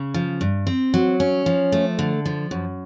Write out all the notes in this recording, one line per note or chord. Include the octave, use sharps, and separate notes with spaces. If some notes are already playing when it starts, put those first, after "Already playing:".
Already playing: C#3
F3
G2
C4
F#3
C#4
F3
A3
D3
F3
F#2